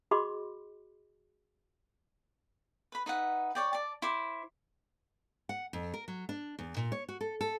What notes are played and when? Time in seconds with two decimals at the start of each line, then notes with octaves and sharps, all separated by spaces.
0.11 F#4 G#4 D#5 B5 C6 D6
2.92 B4 B5
3.06 D#4 B4 E5 F#5
3.55 C#5 D5 G5
3.73 D5 A5
4.02 E4 C5 D6
5.49 F#5
5.73 F2
5.94 A#4
6.08 F#3
6.29 D4
6.59 E2
6.77 A#2
6.92 C#5
7.09 F#4
7.21 A4
7.41 A4